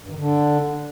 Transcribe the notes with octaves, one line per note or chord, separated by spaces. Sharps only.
G2
D#3
D3